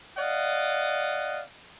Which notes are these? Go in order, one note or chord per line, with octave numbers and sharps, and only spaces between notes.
D5 D#5 F5 F#5